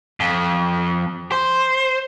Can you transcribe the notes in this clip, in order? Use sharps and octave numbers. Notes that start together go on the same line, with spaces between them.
F2
C5